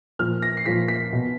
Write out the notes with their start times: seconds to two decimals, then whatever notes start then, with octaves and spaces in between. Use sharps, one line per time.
0.19 A#2 F3 F6
0.42 A#6
0.57 C7
0.66 A#2 F3 B6
0.88 B6
1.13 B2